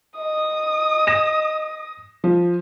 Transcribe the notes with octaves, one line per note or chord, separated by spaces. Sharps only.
D#5 D#6
A#6 E7
F3